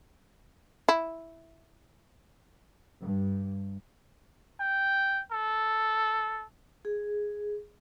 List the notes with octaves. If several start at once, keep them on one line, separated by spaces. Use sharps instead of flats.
E4
G2
G5
A4
G#4